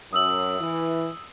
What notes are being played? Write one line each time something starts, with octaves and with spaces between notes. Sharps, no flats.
F#2 D#6 E6 F#7
E3